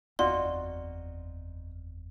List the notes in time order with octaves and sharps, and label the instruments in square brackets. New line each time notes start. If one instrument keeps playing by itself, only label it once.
[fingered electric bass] F#1 E2 C4 [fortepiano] D#4 F4 F#4 [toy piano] D5 [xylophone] C6